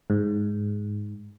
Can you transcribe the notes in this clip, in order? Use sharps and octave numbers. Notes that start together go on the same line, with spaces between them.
G#2